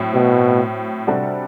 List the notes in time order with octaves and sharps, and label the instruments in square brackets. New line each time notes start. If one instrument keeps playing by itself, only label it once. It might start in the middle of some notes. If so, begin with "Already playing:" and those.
Already playing: [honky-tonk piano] A2 F#3 C4
[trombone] B2
[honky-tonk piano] C3 G3 D4 F#4 A4